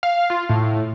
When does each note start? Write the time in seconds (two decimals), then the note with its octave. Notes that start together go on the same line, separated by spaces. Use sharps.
0.03 F5
0.30 F4
0.49 A2